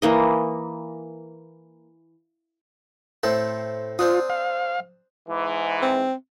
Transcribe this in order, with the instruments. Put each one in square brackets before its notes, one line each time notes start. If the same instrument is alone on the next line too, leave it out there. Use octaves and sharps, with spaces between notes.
[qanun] E3 A#3 D#5
[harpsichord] A2 C4 A4
[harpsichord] C4 D4 D#6 [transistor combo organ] F4
[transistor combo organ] F5
[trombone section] G#2 E3
[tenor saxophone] C4